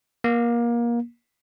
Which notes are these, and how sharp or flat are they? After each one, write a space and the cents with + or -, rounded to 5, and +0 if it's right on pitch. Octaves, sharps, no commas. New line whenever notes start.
A#3 +25